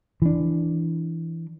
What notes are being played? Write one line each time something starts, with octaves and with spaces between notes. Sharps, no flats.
E3 D4